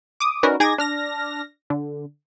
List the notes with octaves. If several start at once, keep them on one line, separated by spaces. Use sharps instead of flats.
D6 D#6
C#4 D#4 F#4 A#4 B4 D5
D#4 G#4 G#5 D6 G#6 A#6
D4 F6 A#6
D3